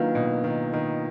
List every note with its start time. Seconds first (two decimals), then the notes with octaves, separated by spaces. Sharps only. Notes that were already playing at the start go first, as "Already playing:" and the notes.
Already playing: D#3 F#3 A#3 D4 F4 B4 F5
0.15 B2
0.44 D#3
0.73 D#3